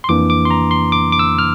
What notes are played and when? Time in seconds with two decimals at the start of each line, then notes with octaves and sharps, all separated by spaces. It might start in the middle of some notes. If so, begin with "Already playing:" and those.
0.04 C6
0.09 F2 E3 A#3 D4 D6
0.30 D6
0.45 C6
0.51 A#5
0.71 C6
0.92 D6
1.12 D6
1.19 E6
1.39 F6